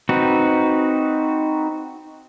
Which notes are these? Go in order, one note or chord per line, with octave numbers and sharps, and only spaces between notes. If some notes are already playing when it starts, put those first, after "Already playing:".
C4 D#4 F#4 B4